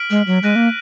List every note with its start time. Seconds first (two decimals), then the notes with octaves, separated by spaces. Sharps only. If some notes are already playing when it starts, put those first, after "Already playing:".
Already playing: F6 B6 D7 F#7
0.10 G#3
0.27 F#3
0.43 G#3 F#6 A#6 D#7
0.56 A#3